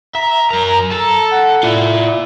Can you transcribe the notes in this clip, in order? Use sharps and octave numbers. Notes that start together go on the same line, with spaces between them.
E5 A#5
F#2 A#4 A#5
A4 A5 A#5
F#5
E4 F4 D5